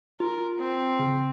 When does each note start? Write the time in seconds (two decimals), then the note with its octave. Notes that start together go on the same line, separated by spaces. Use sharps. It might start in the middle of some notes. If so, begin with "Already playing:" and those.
0.20 F4 A#4
0.58 C4
0.99 C#3